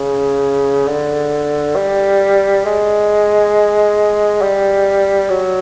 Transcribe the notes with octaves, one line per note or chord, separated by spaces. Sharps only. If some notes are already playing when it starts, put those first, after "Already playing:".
Already playing: C#3
D3
G3
G#3
G3
F#3